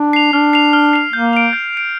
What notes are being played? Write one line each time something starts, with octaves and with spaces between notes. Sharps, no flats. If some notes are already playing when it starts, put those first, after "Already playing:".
Already playing: D4
C7 F7
D4 F6
C7 F7
F6
C7 F7
A#3 G6
D7 F7
G6
D7 F7